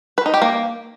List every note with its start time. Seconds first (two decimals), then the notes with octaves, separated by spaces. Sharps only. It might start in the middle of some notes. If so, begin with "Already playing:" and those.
0.18 B4
0.26 D#4
0.34 G4
0.42 A#3